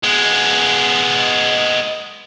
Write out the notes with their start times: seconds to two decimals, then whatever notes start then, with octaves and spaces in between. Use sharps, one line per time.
0.03 G#3 B3